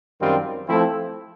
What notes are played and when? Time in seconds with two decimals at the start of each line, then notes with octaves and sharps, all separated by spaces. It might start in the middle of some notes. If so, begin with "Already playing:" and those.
0.19 F#2 D#3 G3 C4 F4
0.68 F3 A3 C4 E4